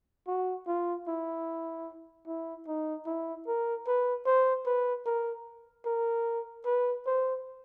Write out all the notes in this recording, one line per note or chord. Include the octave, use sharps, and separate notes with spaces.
F#4
F4
E4
E4
D#4
E4
A#4
B4
C5
B4
A#4
A#4
B4
C5